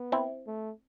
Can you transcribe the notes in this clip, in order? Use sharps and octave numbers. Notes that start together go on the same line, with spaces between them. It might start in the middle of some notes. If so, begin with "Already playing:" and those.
Already playing: B3
C4 E4
A3